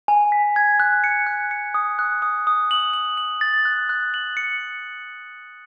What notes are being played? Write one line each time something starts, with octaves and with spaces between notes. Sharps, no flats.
G#5
B6
G#6
F#6
C#7
F#6
C#7
D#6
F#6
D#6
D#6
F#7
F#7
F#7
A6
F#6
F#6
F#7
C#7